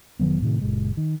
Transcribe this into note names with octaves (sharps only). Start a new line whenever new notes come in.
F1 D#3 F#3 B3
A2 C3 D#3
F#1 A#2 G#3
D#3